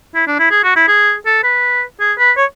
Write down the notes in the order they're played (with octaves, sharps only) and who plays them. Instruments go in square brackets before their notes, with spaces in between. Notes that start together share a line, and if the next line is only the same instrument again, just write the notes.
[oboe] E4
D4
E4
G#4
F#4
E4
G#4
A4
B4
G#4
B4
C#5